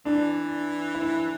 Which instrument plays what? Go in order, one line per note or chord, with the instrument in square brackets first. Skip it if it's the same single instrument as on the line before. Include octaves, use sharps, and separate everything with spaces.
[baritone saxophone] E3 [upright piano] D4
[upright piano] E4